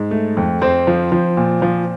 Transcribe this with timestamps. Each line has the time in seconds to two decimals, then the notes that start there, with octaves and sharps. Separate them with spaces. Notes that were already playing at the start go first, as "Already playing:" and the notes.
Already playing: G#2
0.11 A3
0.37 F2
0.61 F2 C4 C5
0.87 F3
1.12 F3
1.37 A#2
1.62 F3